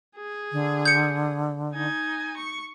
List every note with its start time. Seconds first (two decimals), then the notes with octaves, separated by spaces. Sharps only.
0.16 G#4
0.52 D3
0.85 G6 C#7
1.73 D#4 G#5
2.37 C#6